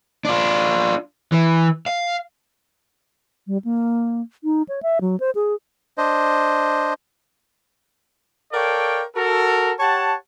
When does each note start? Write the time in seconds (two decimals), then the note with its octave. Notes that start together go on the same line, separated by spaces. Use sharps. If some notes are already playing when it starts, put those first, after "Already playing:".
0.25 D4 F4
1.32 E3
1.86 F5
3.47 G3
3.64 A#3
4.44 D#4
4.69 C#5
4.83 E5
5.01 F#3
5.20 C5
5.35 G#4
5.98 D4 C5 D#5
8.53 A4 A#4 C#5 D5 F5 G5
9.16 F#4 A4 A#4
9.80 G4 C#5 F#5 A5